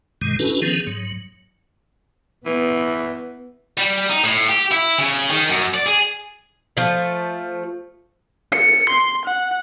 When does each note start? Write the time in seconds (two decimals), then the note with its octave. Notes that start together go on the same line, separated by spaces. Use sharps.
0.21 G2 B2 D#3 G#3
0.39 C#4 D4 E4 F#4 A4 B4
0.62 D#3 F3 B3 C#4 G#4
0.87 G#2 F#3
2.46 E3 B3
3.77 G3
4.09 D#4
4.24 A2
4.49 G4
4.72 E4
4.98 C#3
5.30 D#3
5.49 F#2
5.74 D5
5.86 G#4
6.77 F3 A3
8.53 C#7
8.90 C6
9.25 F#5